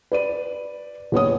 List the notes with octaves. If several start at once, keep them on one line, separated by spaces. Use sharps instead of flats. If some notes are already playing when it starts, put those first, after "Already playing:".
B4 D5 D#7
F#1 B3 C#5 D#6